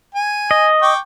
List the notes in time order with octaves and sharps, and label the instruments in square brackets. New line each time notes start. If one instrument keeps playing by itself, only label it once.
[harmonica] G#5
[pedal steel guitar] D#5
[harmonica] G5 C#6 D6